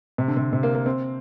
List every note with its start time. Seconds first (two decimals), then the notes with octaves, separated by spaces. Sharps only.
0.18 C3
0.28 D3
0.37 C3
0.53 C3
0.63 A#3
0.75 A#3
0.86 C4